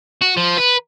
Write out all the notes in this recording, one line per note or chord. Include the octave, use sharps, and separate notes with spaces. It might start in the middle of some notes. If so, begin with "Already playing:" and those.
F#4
F3
B4